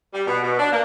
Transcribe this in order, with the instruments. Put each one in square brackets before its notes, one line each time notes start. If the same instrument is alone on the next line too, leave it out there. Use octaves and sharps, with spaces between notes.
[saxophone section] G3
B2
B2
D4
A#3